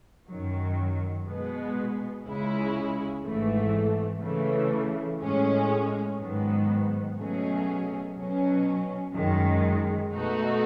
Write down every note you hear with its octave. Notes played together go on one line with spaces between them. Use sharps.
F#2 D#3 F#3
B2 G#3 B3
C#2 C#3 G#3 C#4 E4
G#1 G#2 E3 A3
C#3 E3 A3
A2 G#3 C#4
G#2 D#3 F#3 B3
B2 F#3 A3 C#4 G#4
B2 F#3 C#4
F#2 D#3 G#3
B2 A3 D#4 F#4